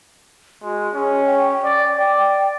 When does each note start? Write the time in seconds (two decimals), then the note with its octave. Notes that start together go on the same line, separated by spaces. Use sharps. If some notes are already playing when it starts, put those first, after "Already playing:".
0.63 G#3 F#4
0.94 C#4 G#4
1.26 G5
1.64 D5
1.99 D5